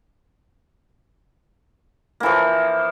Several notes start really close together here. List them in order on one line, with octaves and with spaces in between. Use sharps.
A#3 E3 F3